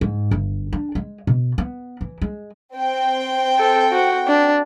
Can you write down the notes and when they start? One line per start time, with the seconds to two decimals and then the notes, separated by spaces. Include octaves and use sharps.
0.01 G#2
0.31 G1
0.73 D4
0.95 G#3
1.27 B2
1.58 B3
2.01 E3
2.22 G#3
2.75 C4 G5
3.58 A4
3.92 F#4
4.27 D4